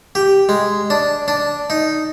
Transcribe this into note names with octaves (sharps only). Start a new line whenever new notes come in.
G4
G#3
D4
D4
D#4